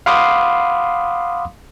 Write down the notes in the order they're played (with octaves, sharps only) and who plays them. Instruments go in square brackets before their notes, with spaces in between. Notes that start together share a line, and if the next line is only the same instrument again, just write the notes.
[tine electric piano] F5 F#5 B5 C6 D6 D#6